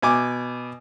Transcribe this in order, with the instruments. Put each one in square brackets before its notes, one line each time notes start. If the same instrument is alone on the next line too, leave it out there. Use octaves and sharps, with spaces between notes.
[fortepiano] B2 G#5 D6